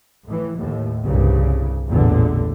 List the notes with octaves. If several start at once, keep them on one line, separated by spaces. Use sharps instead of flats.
A2 E3
D#2 A2
C2 G2 C#3
A1 E2 G2 A#2 D3